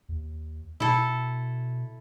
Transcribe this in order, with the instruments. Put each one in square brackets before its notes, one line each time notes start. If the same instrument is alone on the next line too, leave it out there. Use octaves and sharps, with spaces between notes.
[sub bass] D#2
[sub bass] B2 [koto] E4 A4